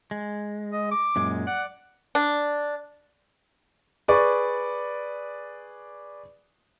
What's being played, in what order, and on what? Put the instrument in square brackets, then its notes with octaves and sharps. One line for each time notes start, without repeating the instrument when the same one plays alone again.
[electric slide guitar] G#3
[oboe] D#5
D6
[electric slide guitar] F#2 A#2 G#3
[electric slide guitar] D5 [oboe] F#5
[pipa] D4
[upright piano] G#4 B4 D5 C#6